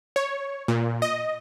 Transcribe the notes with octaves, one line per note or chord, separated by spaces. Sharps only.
C#5
A#2
D#5